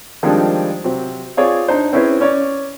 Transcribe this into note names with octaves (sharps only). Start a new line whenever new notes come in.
D#3 F3 G3 G#3 C4 D4
C3 F#3 C4
C4 F4 G#4 C#5 D5
D4 D#4 C5
C4 C#4 E4 G#4 B4 C5
C#4 C#5 D5